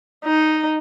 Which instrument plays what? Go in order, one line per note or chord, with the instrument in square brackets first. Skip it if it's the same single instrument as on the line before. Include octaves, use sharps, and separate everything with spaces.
[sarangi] D#4